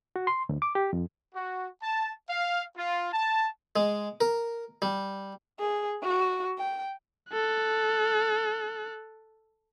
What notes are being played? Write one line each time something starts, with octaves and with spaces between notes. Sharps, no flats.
F#4
C6
D2
D6
G4
F2
F#4
A5
F5
F4
A5
G#3
A#4
G3
G#4
F#4
G5
A4 F#6